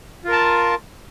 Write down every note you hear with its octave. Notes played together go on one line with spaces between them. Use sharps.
F4 A#4 A5